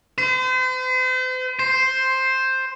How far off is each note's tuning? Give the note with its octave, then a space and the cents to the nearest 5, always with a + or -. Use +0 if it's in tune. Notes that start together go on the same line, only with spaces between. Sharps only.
C5 -40
C5 +5